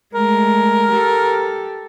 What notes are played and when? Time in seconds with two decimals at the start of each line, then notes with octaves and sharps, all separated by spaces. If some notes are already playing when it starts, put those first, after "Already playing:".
0.15 G#3 A3 A#4
0.90 G4 A4